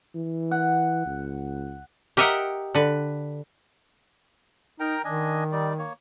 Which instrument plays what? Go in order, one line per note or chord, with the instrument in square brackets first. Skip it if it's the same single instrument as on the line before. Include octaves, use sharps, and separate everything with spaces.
[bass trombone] E3
[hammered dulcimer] F#5
[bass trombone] C#2
[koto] G4 A#4 D#5 E5 F#5 G5
D3 B4
[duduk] D#4 [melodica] A#4 G5 A#5
[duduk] D#3 [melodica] D4 D#5 G#5
[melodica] G3 D#4 D5
A#3 C#5